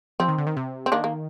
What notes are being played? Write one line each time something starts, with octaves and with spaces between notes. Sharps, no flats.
F3 C4
D#3
D3
D#3
C3
C4
D#3 A#3 D4
A#3